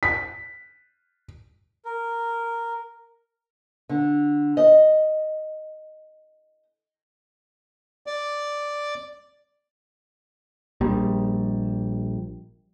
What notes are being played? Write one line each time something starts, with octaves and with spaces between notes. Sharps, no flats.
B6
A#4
D3
D#5
D5
A#1 G3